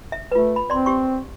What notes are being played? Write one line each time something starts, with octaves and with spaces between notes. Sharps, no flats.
E5
A3 F4 B4
B5
C4 D5 C6
G4 C6 C#6